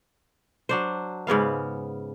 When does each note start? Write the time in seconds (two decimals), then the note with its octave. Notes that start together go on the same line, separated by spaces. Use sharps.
0.69 F#3 D4 C5
1.27 G#2 C#3 B3 F5